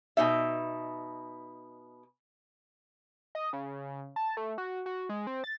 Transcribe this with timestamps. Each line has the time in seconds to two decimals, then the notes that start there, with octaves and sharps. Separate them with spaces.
0.17 B2 D#4 E5
3.35 D#5
3.53 C#3
4.16 A5
4.37 A3
4.58 F#4
4.86 F#4
5.09 G#3
5.27 C4
5.44 A6